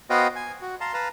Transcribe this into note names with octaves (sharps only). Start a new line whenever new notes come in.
B3 F#4 C5 D#5 F5 G5
G#5
F#4
F5 A5 A#5 C6
B4 F5 A5 A#5